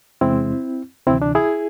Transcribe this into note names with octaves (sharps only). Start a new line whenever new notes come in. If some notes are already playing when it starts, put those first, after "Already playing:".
E2 C3 G#3 C4 E4
D2 C3 E3 C4 E4
D4
E4 G#4